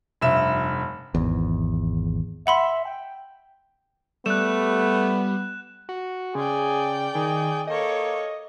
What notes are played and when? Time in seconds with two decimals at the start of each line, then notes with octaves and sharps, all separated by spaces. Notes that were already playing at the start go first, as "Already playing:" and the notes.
0.21 F1 G2 E5 E7
1.15 G#1 E2
2.47 E5 F#5 B5 C6
2.85 G5
4.26 G3 A3 B3 F#6 E7
5.89 F#4
6.35 C#3 G#4 D5 G5
7.15 D#3 G#4
7.67 A#3 A4 C#5 D#5